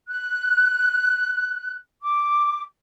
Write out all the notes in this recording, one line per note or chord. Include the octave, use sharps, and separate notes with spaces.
F#6
D6